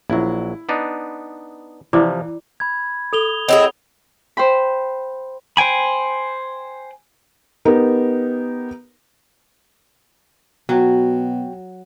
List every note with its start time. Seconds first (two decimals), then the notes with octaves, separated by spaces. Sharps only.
0.10 A#1 F#3 E4
0.69 B3 D4 D#4
1.93 C3 E3 F3 E4 D5 D6
2.60 B5 G#6
3.13 A4 D#6 F7 G7
3.49 C4 E4 G#4 C#5 D#5 F#5 F7
4.37 C5 G5 B5
5.57 C5 G5 G#5 B5
7.65 B3 D#4 G4 A#4
10.69 B2 F#3 F#4 G5